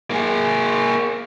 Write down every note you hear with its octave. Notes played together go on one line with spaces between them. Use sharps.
A#3 G#4